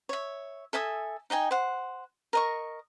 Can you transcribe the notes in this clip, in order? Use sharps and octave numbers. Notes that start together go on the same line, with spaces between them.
C#5 E5
A4 E5 G#5 D#6
D#4 D#5 G5 G#5
C5 F#5
A#4 D#5 C#6